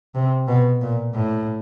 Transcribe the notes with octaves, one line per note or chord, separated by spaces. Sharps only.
C3
B2
A#2
A2